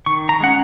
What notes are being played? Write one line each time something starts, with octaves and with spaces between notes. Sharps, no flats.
D#3 C#6
A#5
G#3 C#4 F#5